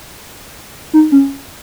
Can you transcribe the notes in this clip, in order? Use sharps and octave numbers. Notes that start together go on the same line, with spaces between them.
D#4
C#4